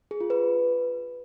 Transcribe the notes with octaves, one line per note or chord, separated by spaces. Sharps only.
G#4
F4
B4